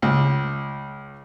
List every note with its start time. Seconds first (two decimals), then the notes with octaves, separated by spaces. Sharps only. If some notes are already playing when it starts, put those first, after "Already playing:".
0.02 C#2